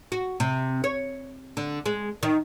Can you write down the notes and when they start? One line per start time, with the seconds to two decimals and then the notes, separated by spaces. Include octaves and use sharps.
0.12 F#4
0.40 C3
0.84 C#5
1.57 D3
1.86 G#3
2.23 D#3